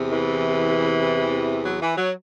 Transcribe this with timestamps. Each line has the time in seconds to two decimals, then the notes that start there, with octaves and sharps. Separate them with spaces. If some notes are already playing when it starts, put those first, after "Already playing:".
Already playing: E2 C3
0.11 E3
1.63 F#3
1.81 E3
1.97 F#3